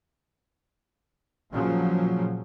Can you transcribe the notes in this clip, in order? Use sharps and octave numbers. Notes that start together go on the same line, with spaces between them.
A#2 C#3 F3 F#3